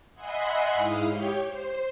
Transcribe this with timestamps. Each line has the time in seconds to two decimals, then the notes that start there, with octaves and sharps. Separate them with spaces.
0.14 D#5 E5 F#5 G#5 B5 C6
0.74 G#2 E4 F5 D#6
1.06 G4 C#5 G6
1.46 C5